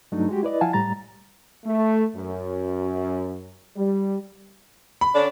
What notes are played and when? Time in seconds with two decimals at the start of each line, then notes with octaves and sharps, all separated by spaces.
0.12 G2 F#3 A3 D4 D#4
0.29 G#3 F#4 G4
0.43 E4 B4 D5 D#5
0.61 F3 E4 F5 F#5 G#5 A5
0.73 A2 G3 A#5 A6
1.65 A3
2.16 F#2
3.76 G3
5.01 B5
5.14 D3 C#4 D4